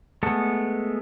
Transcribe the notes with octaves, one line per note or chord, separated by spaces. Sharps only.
G#3 A3 B3 A4